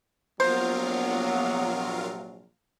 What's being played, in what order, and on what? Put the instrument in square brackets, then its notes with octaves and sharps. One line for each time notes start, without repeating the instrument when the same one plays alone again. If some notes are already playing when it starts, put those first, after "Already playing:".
[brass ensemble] A#1 C3 F#3 [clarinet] B3 [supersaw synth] F4 A#4 F5 [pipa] C5